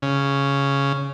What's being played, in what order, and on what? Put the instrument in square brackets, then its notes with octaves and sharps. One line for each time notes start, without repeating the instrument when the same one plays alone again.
[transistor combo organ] C#3